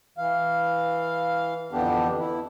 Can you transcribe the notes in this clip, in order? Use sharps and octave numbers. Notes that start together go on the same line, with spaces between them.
E3 F5
F2 D3 E3 B3 D4 G4
E4